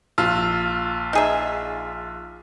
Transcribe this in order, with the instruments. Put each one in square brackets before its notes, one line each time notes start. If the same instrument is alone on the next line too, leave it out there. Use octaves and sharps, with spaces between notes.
[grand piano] A#1 F4 E6
[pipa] D#4 G#4 E5